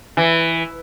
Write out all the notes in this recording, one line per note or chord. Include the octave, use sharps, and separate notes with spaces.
E3